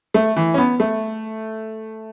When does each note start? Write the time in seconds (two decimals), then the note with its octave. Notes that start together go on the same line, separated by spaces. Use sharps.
0.14 A3
0.36 E3
0.54 C#4
0.58 B3
0.80 A3